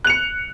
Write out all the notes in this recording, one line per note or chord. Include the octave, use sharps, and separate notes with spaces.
F#6 C#7 F7